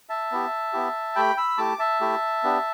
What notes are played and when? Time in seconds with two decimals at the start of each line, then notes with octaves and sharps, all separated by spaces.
0.09 E5 A5
0.32 B3 E4 G4
0.73 B3 E4 G4
1.16 A3 G4 G5 B5
1.37 B5 E6
1.58 A3 E4 G4 A5 D6
1.79 E5 A5
2.01 A3 E4 G4
2.43 B3 D4 G4